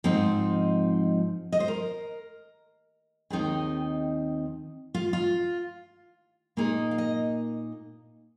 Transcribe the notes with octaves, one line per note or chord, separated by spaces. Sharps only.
G#2 F3 C4 D#4
D#5
C5
A#4
D#2 D#3 C4 D#4 G#4
F4
F4
A#2 A#3 D#4 G#4
F5
D#5